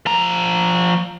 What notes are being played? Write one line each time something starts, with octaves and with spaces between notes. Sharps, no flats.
F3 A#5